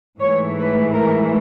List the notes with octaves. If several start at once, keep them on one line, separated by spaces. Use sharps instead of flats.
G#2 E3 A3 C#5
B4
A#4